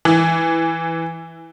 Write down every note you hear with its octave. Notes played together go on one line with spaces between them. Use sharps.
E3